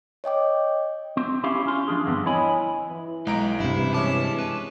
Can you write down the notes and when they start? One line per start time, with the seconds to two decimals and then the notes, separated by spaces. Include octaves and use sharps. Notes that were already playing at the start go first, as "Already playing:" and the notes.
0.24 C#5 D#5 G5 D6
1.17 C4
1.44 C#4 E4 G4 F5
1.66 C#4 F4 C6
1.88 F3 G#3 D4 G#4
2.05 E2 G2 D3 B3 C4
2.26 E4 C#5 D#5 G#5 B5
2.89 E3
3.27 B1 G#3 A#5 D7
3.60 G2 C3 E4
3.94 G#3 C#4 A5 D6
4.39 B4